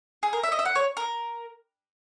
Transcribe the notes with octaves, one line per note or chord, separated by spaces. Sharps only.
G#4
A#4
E5
D#5
E5
F#5
C#5
A#4